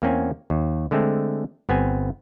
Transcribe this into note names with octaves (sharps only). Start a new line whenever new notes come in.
E2 A#3 C4 C#4 G#5
D#2
D3 G#3 A3 C4
G1 B3 C4 G#5